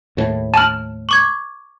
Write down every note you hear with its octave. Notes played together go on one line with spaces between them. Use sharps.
D#2 A2
A5 F6 D#7 F#7
C#6 D6 G#6